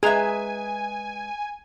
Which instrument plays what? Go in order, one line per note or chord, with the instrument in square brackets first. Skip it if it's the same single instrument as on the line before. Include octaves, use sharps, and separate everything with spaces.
[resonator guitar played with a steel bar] G#3 B4 E5 [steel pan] G#4 [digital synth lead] G#5 [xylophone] A#5 G#6